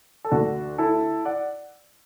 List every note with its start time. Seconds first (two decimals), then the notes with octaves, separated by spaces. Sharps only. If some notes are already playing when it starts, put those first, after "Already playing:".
0.25 A4
0.31 D2 D3 D4 F#4
0.78 E4 A4
1.25 D5 F#5